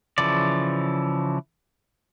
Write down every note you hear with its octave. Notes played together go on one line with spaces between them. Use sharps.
C#3 E3 F3 D5